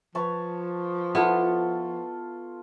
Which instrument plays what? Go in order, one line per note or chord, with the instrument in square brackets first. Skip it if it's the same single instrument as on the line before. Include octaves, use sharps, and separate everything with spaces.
[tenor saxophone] F3 [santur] B4 C#5 A5
[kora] B3 E4 [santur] F4 A4